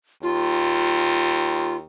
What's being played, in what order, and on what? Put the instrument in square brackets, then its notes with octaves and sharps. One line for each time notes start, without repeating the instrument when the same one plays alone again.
[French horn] D#2 [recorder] F4